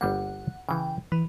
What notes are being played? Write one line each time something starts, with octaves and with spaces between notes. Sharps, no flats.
G1 G3 A#3 F#5
C#3 E3 G5
E3 B4